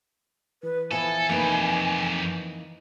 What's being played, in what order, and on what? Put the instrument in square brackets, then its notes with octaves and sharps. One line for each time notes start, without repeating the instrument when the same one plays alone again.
[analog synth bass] E3 [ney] B4
[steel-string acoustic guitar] F3 B3 E4 [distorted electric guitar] A4 [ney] G#5
[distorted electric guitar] F2 G4 [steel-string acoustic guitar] A#3 D#4 B4